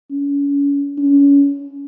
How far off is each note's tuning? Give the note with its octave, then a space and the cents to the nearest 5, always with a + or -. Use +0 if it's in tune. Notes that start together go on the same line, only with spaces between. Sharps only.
C#4 +35
C#4 +25